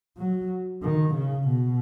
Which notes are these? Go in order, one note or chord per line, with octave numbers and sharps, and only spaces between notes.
F#3
D#3
C#3
B2